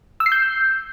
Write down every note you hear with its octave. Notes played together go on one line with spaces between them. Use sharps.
E6
C7
G6